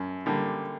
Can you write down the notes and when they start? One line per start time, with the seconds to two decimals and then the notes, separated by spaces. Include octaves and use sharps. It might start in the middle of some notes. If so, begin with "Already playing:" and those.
Already playing: F#2
0.26 D3 G3 A#3